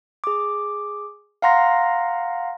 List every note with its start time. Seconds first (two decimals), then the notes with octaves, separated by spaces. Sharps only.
0.24 G#4 D6
1.42 F5 F#5 A#5 C6 A#6